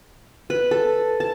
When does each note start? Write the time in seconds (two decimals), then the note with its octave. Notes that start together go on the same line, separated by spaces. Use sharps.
0.50 B4
0.71 A4
1.20 A5